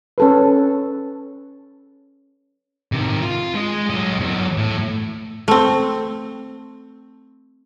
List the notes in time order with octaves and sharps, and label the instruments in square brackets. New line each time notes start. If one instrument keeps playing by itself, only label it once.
[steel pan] C#4 A4 B4
[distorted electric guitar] C3 D#3
F4
G#3 D#5
F#3 D#5
E2 F#3
A2
[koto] A3 C4